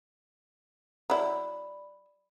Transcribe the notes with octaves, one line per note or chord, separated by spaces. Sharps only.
F#3 E4 D5 B5